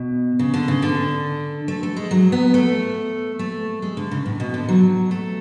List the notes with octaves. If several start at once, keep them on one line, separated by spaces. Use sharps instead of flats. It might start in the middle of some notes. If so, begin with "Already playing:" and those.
Already playing: B2
C#3
D3
C#3
D3
A3
A3
G#3
F#3
B3
A3
A3
G#3
D3
C#3
A2
B2
D3
F#3
A3